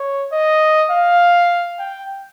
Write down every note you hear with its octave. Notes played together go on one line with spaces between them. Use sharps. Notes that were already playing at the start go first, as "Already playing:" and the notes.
Already playing: C#5
D#5
F5
G5